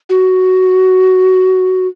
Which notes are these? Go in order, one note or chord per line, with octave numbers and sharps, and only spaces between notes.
F#4